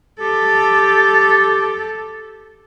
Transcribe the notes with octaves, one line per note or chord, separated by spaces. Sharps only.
G4 A4